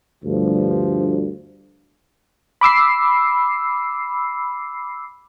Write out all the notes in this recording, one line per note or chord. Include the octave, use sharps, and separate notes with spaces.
D2 G2 F3
B5 D6 E6 C7